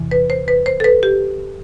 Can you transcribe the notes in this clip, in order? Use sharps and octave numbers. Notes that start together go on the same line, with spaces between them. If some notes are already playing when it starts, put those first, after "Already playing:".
Already playing: E2 C3 E3
B4
C5
B4
C5
A4
B4
G4